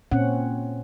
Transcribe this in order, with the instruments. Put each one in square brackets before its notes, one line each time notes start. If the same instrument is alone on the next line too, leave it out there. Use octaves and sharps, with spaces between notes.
[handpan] A#2 C4 C#4 F#5